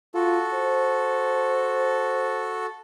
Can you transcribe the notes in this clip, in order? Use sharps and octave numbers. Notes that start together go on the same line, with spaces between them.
F4 F#4 A4
C5